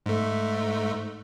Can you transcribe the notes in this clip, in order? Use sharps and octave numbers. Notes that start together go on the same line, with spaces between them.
G#2 A3